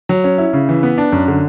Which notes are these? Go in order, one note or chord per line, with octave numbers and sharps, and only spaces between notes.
F#3
C#4
E4
C#3
E3
B3
D4
F#2
D3